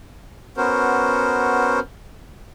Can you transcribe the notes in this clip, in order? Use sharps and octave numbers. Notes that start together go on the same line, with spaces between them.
B3 C#4 F#4 A#4 C5